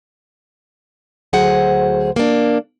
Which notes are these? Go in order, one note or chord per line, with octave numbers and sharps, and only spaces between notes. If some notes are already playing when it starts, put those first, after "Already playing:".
D2 F#3 G#4 C5 F#5
A#3 D4